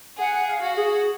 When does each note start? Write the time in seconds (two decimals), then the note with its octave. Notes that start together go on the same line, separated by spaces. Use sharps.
0.18 G#4 F#5
0.46 F5
0.61 F#4
0.76 G#4